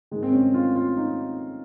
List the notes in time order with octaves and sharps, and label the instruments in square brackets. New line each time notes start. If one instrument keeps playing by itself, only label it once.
[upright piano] G#2 D#3 G#3
C4
C#4
F4
F4
D#4